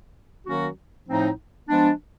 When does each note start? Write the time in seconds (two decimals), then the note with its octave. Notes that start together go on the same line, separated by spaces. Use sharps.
0.46 D#3 F#3 A#3 C#4 F#4
1.07 A2 F3 A3 C4 D#4
1.68 F3 G#3 B3 D4